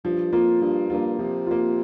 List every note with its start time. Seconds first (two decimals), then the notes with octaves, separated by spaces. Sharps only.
0.04 G2 F3
0.33 F2 A#3 F4
0.61 G2 F3
0.90 G2 A#3 F4
1.19 C3 F3
1.47 A#3 F4